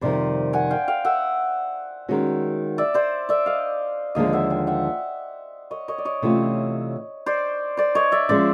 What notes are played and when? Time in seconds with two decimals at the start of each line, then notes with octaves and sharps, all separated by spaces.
0.01 F2 C3 D#3 G3 C5 D5
0.53 F#5 G#5
0.70 F5 G5
0.88 F5 G5
1.05 E5 F#5
2.09 D#3 G#3 C#4 F#4
2.78 D5 E5
2.94 C5 D5
3.29 D5 E5
3.46 D#5 F5
4.15 D#2 D3 F3 G#3 D#5 F5
4.33 E5 F#5
4.50 F5 G5
4.67 E5 F#5
5.71 C#5 D#5
5.88 C#5 D#5
5.98 D5
6.05 C#5 D#5
6.22 C3 E3 A3 C#4 F4
7.26 C5 D5
7.77 C5 D5
7.95 C#5 D#5
8.12 D5 E5
8.29 F3 G#3 C#4 C5 D5